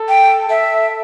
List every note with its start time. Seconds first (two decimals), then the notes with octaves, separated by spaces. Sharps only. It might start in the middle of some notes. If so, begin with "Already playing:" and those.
Already playing: A4
0.09 G5
0.49 A4 E5